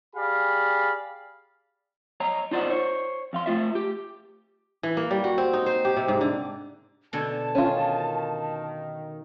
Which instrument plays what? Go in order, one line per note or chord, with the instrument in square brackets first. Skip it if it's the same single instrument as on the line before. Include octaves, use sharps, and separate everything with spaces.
[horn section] G4 G#4 D5 F5 B5
[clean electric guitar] C#5 D#5 A#5
D#4 F4 C5 D5 D#5 F#5
C5 C#5
F2 F5 C6
A3 F4 E5
G4
[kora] E3
A#3
G3
F#4
C4
D#4
C5
G4
C3
G#2
D3
[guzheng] B2 D3 G#5 [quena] A5
[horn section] D#3 [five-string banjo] C#4 F4